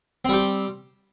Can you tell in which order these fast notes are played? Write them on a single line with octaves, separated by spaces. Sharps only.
C4 G3 G4